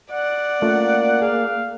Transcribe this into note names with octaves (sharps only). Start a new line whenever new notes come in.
D5 F#5
A3 A#3 C#4 F4
G#4 F5